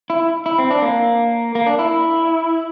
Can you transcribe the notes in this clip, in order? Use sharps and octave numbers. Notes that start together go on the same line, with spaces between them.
E4
E4
C4
D4
A#3
A#3
D4
E4